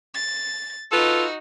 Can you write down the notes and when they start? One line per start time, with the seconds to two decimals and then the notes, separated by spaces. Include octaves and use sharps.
0.15 A6
0.92 D#4 F4 F#4 A4 B4